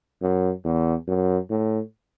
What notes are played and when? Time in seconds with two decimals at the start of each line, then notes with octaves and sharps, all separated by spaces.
0.22 F#2
0.65 E2
1.08 F#2
1.50 A2